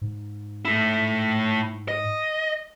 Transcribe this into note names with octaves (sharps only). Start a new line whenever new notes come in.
G#2
A3 E4
D#5